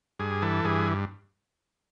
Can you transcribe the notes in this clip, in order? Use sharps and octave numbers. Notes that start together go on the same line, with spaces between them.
G2 G#4
E3 A4
G2 G#4